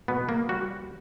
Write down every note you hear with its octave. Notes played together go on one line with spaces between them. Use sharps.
B2 B3
A#3
G3 F#4